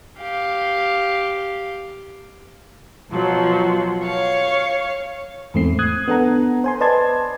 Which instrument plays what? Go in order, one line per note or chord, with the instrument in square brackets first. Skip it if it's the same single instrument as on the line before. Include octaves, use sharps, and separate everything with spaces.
[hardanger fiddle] G4 F5
[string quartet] B2 F3 F#3
C#5 F5 C#6
[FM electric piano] E2 G#2 A3 C4 C7
D#6 F#6 G#6
B3 D4 A4 F#5 A#5
C5 G#5 C6
B4 D5 D#5 A5 C6 G#6